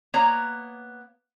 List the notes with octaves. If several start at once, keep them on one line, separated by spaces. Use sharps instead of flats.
A#3 B3 C#5 A#5